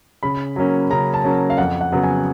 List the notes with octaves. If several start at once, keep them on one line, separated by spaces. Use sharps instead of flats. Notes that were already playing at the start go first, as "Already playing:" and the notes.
C#3 B5
F#3 A#3 C#4
C#3 A#5
A5
F#3 A#3 C#4
F5
F2 F#5
F#5
C#3 F#3 B3
G#5